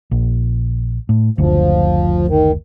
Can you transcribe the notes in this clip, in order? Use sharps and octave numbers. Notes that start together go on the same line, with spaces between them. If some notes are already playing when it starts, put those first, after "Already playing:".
A#1
A2
F#1 D2 F3
D#3